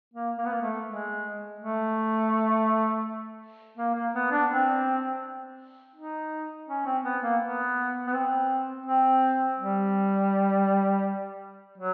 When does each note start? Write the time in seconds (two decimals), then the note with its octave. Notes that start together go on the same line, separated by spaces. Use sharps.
0.14 A#3
0.38 A#3
0.45 B3
0.52 A#3
0.62 A3
0.86 G#3
1.59 A3
3.77 A#3
3.95 A#3
4.14 B3
4.31 D4
4.50 C4
5.95 D#4
6.69 C#4
6.86 C4
7.04 B3
7.22 A#3
7.40 B3
8.07 B3
8.14 C4
8.86 C4
9.59 G3
11.78 F#3